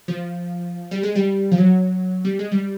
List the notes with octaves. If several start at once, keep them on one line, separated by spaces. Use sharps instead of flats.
F3
G3
G#3
G3
F3
F#3
G3
G#3
G3